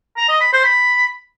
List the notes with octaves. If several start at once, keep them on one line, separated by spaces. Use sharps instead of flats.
A#5
D#5
B5
C5
B5